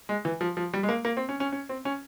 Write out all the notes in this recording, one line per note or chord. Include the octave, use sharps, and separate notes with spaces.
G#3
E3
F3
F3
G3
G#3
A#3
A#3
C4
C#4
C#4
C#4
C4
C#4